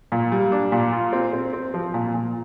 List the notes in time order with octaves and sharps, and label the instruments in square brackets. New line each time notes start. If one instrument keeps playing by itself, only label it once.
[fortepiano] A#2
G3
D4
A#2
F4
C4
C4
C4
F3
A#2
A#2